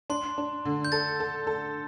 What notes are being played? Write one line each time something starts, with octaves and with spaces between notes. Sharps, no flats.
D4 C6
D4
D3
G6
A4 A6
A4
A4